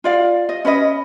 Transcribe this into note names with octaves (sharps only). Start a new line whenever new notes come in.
F4 D5 F5
D#5
C#4 B4 C5 D#5